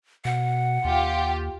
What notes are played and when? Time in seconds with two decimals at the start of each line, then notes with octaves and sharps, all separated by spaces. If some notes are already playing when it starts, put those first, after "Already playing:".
0.25 B2 F#5
0.84 D#2 F4 G4